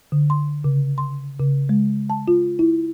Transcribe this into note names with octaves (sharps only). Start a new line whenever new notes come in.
D3
C6
C#3
C6
C#3
G#3
A5
F4
E4